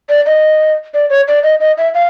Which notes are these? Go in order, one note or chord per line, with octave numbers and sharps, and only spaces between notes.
D5
D#5
D5
C#5
D5
D#5
D#5
E5
F5